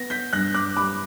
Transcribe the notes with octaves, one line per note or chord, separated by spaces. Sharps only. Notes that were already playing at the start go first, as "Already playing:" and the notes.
Already playing: B3 A#6
G6 B6
G2 F#6 A#6
D6 F#6
G3 B5 D6